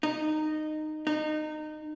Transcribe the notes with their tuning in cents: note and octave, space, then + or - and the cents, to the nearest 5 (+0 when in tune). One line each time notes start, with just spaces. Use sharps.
D#4 -15
D#4 -25